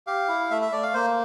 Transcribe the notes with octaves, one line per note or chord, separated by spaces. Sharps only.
G4 F5
E4
A3 E5
E5
A3 D5
F5
A#3 C5